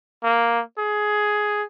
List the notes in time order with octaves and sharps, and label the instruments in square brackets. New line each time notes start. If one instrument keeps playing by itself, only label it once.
[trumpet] A#3
G#4